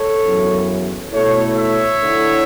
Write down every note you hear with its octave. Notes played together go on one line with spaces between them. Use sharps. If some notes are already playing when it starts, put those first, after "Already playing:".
Already playing: A4 C#5
F#2 C#3 E3 B3
B2 A3 E4 A4 C#5
C#5 E5
D3 A3 E4